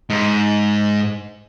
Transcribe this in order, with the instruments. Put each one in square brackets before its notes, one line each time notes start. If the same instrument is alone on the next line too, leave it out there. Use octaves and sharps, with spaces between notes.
[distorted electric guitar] G#2